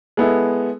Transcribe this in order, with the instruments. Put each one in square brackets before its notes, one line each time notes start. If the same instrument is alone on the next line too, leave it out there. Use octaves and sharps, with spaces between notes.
[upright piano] G#3 B3 E4 A4